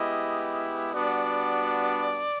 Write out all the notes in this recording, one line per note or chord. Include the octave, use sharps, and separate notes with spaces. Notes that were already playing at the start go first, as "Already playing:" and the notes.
Already playing: G#3 B3 E4 G4 D#5
G3 B3 D4 F#4 D5